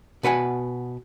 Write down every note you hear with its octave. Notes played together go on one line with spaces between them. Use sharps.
B2 B4 F#5 G#5